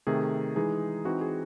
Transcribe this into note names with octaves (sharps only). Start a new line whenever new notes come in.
C3 D#3 A3 G#4
E3 G#3 D#4 G#4
E3 C4 D#4 F#4
G#4